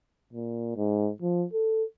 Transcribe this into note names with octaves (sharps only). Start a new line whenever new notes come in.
A#2
G#2
F3
A4